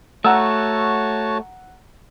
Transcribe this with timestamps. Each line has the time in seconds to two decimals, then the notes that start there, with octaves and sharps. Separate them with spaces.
0.24 A3 F#4 C#5 F#5 A5 A#5 E6